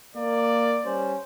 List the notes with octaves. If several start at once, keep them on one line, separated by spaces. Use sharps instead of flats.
A#3 D5
G3 C#4 C5